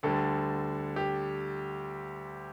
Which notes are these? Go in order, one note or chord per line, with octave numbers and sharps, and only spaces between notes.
D2 D3 G3 A4
G4